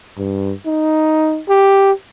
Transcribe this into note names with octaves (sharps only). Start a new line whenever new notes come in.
G2
D#4
G4